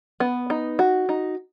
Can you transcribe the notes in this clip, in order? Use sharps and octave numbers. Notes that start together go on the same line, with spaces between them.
B3
D#4
F#4
D#4